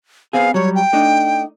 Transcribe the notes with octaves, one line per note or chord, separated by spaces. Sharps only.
B3 C4 G#4 F5
F#3 G3 C#5
G5
A3 D4 D#4